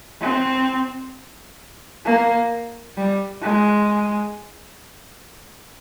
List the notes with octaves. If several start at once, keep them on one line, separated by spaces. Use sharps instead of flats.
C4
A#3
G3
G#3